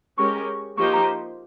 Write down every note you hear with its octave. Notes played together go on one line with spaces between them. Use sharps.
G#3 C#4 G4 A#4 C#6
F3 A#3 D#4 G4 C5 C#6
A#5